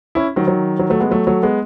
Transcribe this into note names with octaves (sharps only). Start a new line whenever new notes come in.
C#4 E4
D#3 F#3
D#3 F#3
D#3 F#3
F#3 A3
G#3 B3
F#3 A3
F#3 A3
G#3 B3